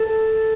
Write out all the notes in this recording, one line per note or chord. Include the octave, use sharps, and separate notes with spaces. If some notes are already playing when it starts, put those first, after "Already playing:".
Already playing: A4